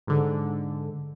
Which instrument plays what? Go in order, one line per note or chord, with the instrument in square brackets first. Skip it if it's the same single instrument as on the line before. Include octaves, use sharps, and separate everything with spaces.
[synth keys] G#2 D3